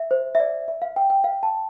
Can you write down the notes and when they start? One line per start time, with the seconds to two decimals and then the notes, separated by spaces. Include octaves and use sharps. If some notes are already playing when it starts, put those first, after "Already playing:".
Already playing: E5
0.11 C5
0.35 E5
0.40 D5
0.68 E5
0.82 F5
0.96 G5
1.10 G5
1.24 F5
1.43 A5